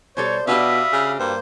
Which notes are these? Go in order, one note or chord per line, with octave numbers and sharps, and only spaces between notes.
B2 G3 A4 C5 C#5
B2 D4 F#4 G4 E5 F5 B5 D#6
C#3
G2 A#3 C5